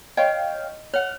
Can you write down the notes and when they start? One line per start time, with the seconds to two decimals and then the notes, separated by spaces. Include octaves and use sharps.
0.17 C#5 D#5 F5 G5
0.94 C#5 F#5 F6